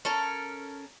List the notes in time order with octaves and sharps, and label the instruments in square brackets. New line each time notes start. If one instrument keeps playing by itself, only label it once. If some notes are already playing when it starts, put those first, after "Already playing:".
[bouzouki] C#4 A4 A#4